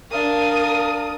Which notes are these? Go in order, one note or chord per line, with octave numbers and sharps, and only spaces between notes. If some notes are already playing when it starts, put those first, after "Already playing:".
D4 A#4 F5 D#6